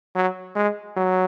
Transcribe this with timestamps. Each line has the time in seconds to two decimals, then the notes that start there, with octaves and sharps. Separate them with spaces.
0.15 F#3
0.56 G#3
0.96 F#3